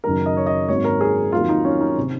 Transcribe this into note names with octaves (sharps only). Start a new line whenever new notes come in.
F#1 F#2 D#3 A#4
D#5
C#5
D#5
G#1 G#2 F#3 A#3 C#5
A#4
G#4
F2 D#3 F#3 A#3 F4
D#4
C#4
D#4
C3 D#3